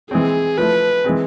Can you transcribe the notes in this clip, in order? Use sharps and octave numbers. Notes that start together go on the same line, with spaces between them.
E3 G#3 C4 G#4
F3 A3 E4 B4
E3 G#3 C4